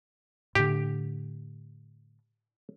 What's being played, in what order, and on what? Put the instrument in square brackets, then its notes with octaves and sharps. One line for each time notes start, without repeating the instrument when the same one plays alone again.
[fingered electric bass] A2 D3 [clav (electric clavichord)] G4